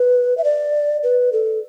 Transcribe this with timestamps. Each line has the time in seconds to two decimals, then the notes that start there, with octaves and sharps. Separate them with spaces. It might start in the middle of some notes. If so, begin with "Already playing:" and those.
Already playing: B4
0.38 E5
0.44 D5
1.03 B4
1.33 A4